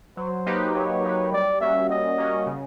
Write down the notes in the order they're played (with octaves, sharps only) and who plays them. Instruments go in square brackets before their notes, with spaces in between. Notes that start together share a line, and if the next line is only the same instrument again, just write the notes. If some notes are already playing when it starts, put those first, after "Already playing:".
[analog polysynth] F#3 [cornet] C5
[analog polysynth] A#3 D#4 G4 B4
[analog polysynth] F#3 [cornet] C#5
[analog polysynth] A#3 D#4 G4 B4
[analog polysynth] G3 [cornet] D5
[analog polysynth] A#3 C#4 F#4 [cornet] E5
[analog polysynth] G3 [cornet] D#5
[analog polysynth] A#3 C#4 F#4
C#3